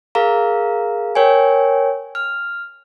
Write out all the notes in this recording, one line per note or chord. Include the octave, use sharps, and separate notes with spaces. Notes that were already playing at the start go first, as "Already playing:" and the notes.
G#4 A#4 F5 A#5
A#4 C#5 G5 G#5
F6